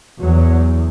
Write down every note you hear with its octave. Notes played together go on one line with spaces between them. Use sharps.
E2 F#3